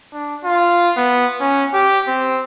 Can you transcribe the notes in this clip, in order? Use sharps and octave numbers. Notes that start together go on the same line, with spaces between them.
D4
F4
B3
C#4
G4
C4